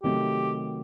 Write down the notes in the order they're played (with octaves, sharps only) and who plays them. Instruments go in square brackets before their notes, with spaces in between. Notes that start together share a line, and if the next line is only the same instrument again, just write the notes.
[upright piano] C3 D#3 F#3 A3 [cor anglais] G4